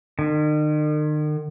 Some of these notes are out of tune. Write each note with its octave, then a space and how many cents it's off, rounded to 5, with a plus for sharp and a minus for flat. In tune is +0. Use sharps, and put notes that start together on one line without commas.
D#3 -45